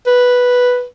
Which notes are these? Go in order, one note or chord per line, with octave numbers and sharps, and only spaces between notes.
B4